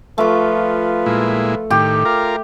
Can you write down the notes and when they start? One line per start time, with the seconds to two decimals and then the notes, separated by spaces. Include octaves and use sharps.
0.18 F3 A3 F4 B4 D6
1.06 A#2 G#3 E4
1.71 A2 D#3 G4
2.05 F4 A#4